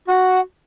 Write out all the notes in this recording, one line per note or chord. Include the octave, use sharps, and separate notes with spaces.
F#4 F#5